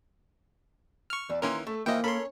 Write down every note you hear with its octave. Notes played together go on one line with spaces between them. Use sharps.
C#6 F6
E2 D5
D#3 E3 A#3 C#4 A#4 C6
A3 A4
E3 F3 A#3 D#5 E5 G5
C#4 A4 A#4 C#5 B5 C6